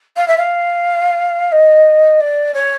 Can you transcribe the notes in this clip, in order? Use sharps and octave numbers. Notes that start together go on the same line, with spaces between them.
F5
E5
F5
D#5
D5
C#5